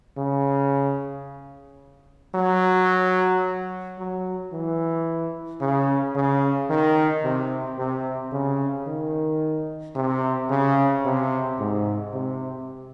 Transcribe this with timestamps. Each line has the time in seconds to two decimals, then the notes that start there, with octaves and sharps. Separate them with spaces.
0.17 C#3
2.35 F#3
3.98 F#3
4.53 E3
5.61 C#3
6.16 C#3
6.70 D#3
7.24 C3
7.78 C3
8.32 C#3
8.87 D#3
9.95 C3
10.50 C#3
11.05 C3
11.59 G#2
12.14 C3